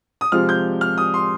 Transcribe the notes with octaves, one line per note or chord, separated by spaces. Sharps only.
D#6
C3 F3 G#3 F6
G6
F6
D#6
C6